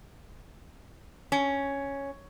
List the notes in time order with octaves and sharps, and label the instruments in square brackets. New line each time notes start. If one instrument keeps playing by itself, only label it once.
[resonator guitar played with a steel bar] C#4